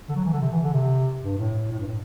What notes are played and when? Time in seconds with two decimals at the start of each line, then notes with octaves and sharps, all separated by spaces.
0.09 D3
0.16 F#3
0.25 E3
0.33 D3
0.42 C3
0.52 E3
0.63 D3
0.74 C3
1.23 G2
1.38 A2
1.71 A2
1.79 G2
1.88 A2